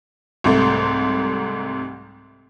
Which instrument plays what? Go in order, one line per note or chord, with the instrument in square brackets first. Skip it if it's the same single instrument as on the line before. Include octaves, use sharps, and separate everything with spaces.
[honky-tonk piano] C2 G#2 C3 A3